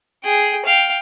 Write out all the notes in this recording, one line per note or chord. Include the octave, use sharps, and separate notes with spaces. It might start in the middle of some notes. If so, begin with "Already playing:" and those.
G#4 G5
F5 G5